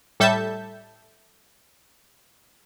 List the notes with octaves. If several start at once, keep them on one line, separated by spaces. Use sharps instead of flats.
A2 G3 A4 E5 A5 G6